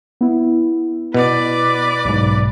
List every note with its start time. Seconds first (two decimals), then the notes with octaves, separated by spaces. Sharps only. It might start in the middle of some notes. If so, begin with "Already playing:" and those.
0.21 B3 E4
1.14 B2 B4 D5
2.05 B1 G#2